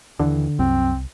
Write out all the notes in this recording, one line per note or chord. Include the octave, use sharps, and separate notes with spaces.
D#2 D3 E3
C2 F#2 C4